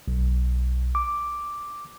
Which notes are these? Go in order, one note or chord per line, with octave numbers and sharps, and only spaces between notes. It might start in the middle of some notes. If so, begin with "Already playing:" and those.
B1
D6